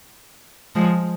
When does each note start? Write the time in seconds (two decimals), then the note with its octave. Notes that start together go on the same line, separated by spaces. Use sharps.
0.75 F3 G#3